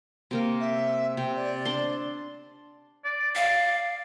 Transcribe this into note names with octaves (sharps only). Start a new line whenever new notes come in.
C3 A#3 A#4
E5
C3 G5
D5
D4 C6
D5
F5